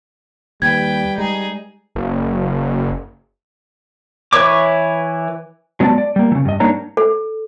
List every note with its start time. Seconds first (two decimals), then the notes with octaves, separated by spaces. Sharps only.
0.62 D#2 G3 B4 G5 G#6
1.18 G#3 D#4 G#4
1.95 F#1
4.33 E3 B4 C#5 D6
5.80 F#3 G#3 B3 D4 D5 A5
5.98 D5
6.16 G3 A#3
6.32 C#3 E3
6.45 G2 D#5
6.60 G3 A#3 D4 D#4 C#5 A#5
6.97 A4